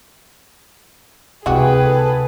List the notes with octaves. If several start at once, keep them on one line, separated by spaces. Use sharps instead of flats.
D2 C3 E3 G#3 F#4 G#4 B4 G5
A4